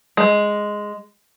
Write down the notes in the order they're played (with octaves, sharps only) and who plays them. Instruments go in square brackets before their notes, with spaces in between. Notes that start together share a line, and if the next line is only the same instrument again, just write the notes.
[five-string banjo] G#3